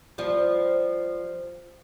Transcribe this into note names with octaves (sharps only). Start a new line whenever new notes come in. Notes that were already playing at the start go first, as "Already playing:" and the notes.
F3 G3